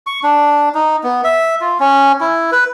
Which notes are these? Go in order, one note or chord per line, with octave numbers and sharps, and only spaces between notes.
C#6
D4
D#4
B3
E5
F4
C#4
E4
B4